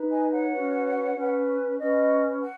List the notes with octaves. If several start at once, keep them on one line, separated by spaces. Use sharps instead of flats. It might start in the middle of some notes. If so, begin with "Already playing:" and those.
Already playing: D#4 B4
D#5 G#5
C#5 F#5
C#4 F#4 B4
C#4 B4
C#4 B4 D#5
F#5